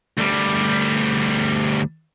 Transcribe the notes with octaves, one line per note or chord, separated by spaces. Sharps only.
D2 G3